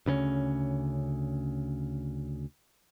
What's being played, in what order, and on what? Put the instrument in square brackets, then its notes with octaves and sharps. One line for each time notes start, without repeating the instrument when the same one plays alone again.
[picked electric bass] D2 C#3 B3 C#4